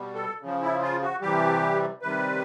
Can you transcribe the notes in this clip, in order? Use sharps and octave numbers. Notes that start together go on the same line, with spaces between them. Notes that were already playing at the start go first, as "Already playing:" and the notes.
Already playing: B2 G3
A4
C#3 F3
E4
F4
F#4
C3 E3 G3 G4
C3 D#3 G3 B4